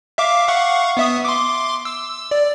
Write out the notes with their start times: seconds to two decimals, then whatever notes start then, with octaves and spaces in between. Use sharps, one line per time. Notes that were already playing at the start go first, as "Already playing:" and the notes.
0.18 E5 F5 D6
0.48 F5 F#5 C#6
0.97 B3 E5 D#6
1.25 C6 D6
1.85 E6
2.31 D5